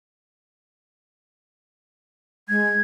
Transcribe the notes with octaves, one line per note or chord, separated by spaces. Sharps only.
G#3 G#6